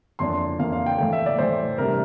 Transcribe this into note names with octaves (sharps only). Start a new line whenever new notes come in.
F2 E3 A#3 D4 C6
F2 E3 A#3 D4 F5
F5
G5
A2 E3 A3 G5
E5
D5
A2 E3 A3 C5
C3 G3 D4 A#4